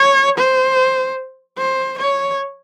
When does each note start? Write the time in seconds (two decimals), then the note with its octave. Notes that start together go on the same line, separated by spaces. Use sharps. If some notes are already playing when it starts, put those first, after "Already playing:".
Already playing: C#5
0.38 C5
1.58 C5
1.98 C#5